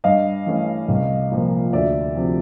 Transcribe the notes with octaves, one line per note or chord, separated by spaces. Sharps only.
G2 D#5 F5
E3 A3 C#4
C2
A#2 F3 A#3
D2 D5 E5
C3 F3